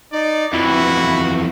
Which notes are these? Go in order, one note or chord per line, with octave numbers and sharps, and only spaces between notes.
D#4 D5
F2 E3 E4 F#4